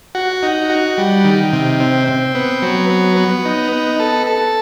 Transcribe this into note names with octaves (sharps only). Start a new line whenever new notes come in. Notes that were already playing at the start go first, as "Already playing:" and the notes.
F#4
D#4
F#4
G3
D#3
C3
C4
C4
B3
F#3
B3
B3
D#4
B3
A4
A4